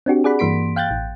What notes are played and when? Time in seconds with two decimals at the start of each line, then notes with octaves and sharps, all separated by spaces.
0.06 C4 D4 F#4 G4
0.24 G#4 D5 F#5 B5
0.39 G2 E3 A#3 C6 B6 D7
0.76 F5 G5 F#6 G6 A6
0.91 A1